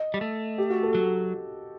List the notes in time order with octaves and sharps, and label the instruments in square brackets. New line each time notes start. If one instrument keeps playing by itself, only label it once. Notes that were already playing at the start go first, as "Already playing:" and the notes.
Already playing: [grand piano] D#5
[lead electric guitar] G3
A3
[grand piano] G4
F#4
A4
[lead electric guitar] F#3